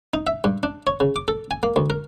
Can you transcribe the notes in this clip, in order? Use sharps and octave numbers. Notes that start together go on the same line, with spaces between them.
D#4
E5
G2
D4
C#5
C#3
D6
A4
G#5
A#3
D2
A#4